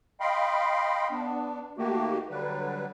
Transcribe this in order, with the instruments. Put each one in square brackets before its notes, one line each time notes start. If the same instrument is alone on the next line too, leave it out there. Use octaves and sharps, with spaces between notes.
[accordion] D#5 F5 G5 B5 C6
B3 D4
D#3 A3 A#3 F#4 G4
D3 F#3 G3 B4